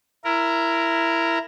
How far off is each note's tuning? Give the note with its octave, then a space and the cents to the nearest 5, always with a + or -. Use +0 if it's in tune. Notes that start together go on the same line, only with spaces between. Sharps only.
E4 +15 A#4 -5